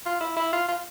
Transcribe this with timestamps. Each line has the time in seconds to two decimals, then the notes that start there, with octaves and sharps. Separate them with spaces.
0.06 F4
0.21 E4
0.36 E4
0.53 F4
0.68 F4